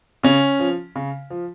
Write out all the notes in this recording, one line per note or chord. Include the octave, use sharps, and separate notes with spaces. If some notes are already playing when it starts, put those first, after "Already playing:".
C#3 C#4
F3
C#3
F3